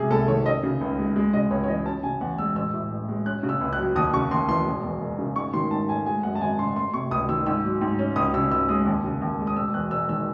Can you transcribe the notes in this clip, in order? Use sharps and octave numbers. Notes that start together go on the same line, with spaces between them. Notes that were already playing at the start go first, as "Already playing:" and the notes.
Already playing: C3 G#3 G#4
C2 A4
D#3 C#5
C#4 D#5
C#3
C#2
G#3
G#3
C#3 D#5
C#2 C#5
C#5
E3 D#5
C#4 A5
C#3 G#5
E2 F#5
G#3 E6
A1 E6
A2
A1
G#3
C#4 F#6
C#3
E6
C#2
F#6
F#3
D#2 D#6
C#3 C#6
D#2 C6
E3 C6
E1
E2
E1
C#3
G#2 C#6
D#3 C6
G#2 A5
A3 G#5
G#3 G#5
F#2 F#5
A5
G#1 G#5
C#3 C6
A3 C6
C3 C#6
C#2 D#6
D#3 E6
G#2 E6
F#3
G#2
C#4
C#2 D#6
C#3 E6
C#2 E6
G#3 D#6
D#2
C#3
D#2
G#3
D#6
E1 E6
E2 F#6
E1 E6
D#3 E6